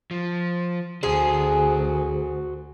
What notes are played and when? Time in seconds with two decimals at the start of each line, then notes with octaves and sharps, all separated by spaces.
0.11 F3
1.03 D2 F#4 G#4 C5